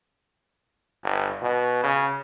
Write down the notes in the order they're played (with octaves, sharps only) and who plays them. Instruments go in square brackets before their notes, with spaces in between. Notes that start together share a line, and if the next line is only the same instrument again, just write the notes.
[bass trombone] G1
B2
C#3